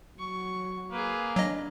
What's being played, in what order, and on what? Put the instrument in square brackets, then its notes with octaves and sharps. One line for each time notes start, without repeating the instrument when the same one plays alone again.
[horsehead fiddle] F#3 [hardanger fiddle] C#6
[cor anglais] A#3 [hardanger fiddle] G#4 B4
[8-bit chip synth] F#3 D#5 [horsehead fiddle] D4